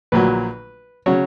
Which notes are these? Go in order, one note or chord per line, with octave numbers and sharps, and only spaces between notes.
A#1 A#2 F#3 B4
C#3 F#3 C#5